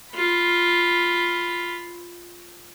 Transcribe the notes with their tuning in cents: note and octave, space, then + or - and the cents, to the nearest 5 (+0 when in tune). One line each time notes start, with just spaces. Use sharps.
F4 +0 B5 +0